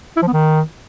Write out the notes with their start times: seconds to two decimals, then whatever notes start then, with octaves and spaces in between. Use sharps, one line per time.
0.17 E4
0.22 F3
0.27 B3
0.33 D#3